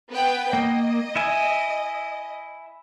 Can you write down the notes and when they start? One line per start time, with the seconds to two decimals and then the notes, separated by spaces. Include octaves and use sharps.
0.11 B3 B4 G5
0.53 A#3 D#5
1.16 E4 E5 G#5